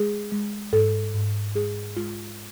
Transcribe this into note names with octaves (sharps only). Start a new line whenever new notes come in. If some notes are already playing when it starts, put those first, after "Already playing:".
Already playing: G#3 G#4
G#3
G#2 A4
G#2
G#3 G#4
G#3 F4